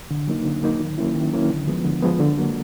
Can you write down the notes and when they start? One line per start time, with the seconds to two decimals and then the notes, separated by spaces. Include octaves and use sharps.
0.11 D3
0.28 F#3 A#3 D#4
0.45 D3
0.63 F#3 A#3 D#4
0.80 D#3
0.98 F#3 A#3 C#4 E4
1.15 D#3
1.32 F#3 A#3 C#4 E4
1.50 D3
1.67 F3 G#3 B3
1.85 D3
2.02 F3 G#3 B3
2.19 D3
2.37 F#3 A#3